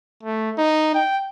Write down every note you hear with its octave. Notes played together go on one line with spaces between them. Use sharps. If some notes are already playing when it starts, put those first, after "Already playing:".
A3
D#4
G5